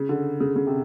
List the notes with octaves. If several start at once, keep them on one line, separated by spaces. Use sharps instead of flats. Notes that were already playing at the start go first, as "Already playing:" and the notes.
Already playing: C#3
D3
C#3
C#3
C3